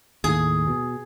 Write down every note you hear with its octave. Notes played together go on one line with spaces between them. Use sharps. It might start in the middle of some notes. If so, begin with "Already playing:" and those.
D#2 A2 G#4
B2